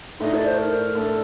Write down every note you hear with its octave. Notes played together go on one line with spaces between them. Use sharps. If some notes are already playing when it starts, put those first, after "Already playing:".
A2 A3 D4 D#4
D5
C5
A#4
A2 A3 D4 A4